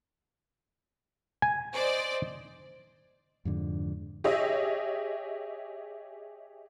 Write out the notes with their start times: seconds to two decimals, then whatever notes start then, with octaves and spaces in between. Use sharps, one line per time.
1.42 G#5
1.73 C5 D5 D#5
3.45 F2 G#2 D3
4.24 G4 G#4 C#5 D#5 E5